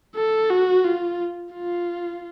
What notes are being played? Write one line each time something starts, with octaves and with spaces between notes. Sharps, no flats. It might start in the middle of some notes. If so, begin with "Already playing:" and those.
A4
F#4
F4
F4